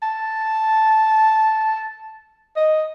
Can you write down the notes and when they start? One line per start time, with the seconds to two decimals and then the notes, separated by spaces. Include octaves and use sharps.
0.03 A5
2.57 D#5